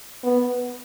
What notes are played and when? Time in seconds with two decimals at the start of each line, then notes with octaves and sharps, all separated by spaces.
0.23 B3